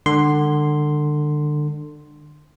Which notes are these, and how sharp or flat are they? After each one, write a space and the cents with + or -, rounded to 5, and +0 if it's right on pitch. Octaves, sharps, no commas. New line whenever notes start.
D3 +25 G#3 -30 C6 +0